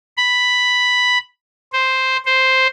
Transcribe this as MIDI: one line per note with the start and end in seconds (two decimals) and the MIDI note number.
0.17 1.18 83
1.73 2.17 72
2.25 2.67 72